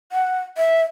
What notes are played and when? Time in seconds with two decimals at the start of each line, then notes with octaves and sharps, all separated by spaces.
0.12 F#5
0.58 E5